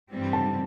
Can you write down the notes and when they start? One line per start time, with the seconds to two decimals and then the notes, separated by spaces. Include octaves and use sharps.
0.12 G2 E3 G3 C4
0.33 A5